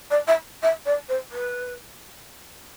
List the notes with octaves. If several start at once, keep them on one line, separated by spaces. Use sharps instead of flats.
D5
E5
E5
D5
C5
B4